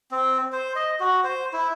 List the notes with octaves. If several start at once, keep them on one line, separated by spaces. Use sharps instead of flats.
C4
C5
D#5
F#4
C5
E4